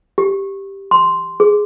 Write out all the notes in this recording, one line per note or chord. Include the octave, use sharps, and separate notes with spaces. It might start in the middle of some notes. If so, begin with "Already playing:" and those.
G4
C6
G#4